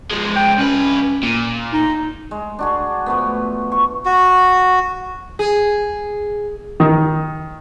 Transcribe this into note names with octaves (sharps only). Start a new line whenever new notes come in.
F3 G#3
G5
C2 C#4 B4
A#2
D#4
G#3
D4 F#4 G#4
F3 A3 B3
C#6
F#4
G#4
D#3